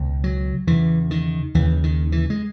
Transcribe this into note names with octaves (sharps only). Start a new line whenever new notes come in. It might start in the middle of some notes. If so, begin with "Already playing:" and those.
Already playing: C#2 B2
F#3
E2 C#3 E3
D#3
D#2 C#3 E3
D#3
E3
G#3